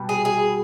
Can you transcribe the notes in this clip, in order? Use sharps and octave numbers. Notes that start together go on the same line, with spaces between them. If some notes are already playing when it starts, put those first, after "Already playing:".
Already playing: B2 G3
G#4
G#4